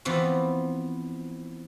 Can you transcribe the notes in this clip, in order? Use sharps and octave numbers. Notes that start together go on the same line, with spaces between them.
E3 F3 B3 C4